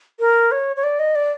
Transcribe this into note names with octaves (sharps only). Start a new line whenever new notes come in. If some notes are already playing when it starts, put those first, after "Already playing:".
A#4
C#5
C#5
D5
D#5
D5